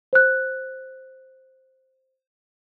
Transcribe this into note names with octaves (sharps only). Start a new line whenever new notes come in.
C5 F#6